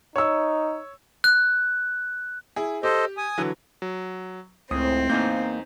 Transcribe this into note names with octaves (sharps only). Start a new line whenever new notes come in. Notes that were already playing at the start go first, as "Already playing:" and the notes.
D#4 C#5 E6
F#6
E4 G#4
G4 A4 C5 D#5
G#5 D#6
D3 E3 F#3
F#3
C#2 A2 C4 C5 D#6
E2 A#3 D#4 G6